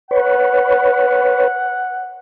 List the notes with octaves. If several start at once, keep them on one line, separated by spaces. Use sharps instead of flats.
B4 C#5 F#5